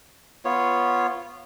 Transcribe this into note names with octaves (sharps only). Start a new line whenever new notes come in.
B3 F4 C#5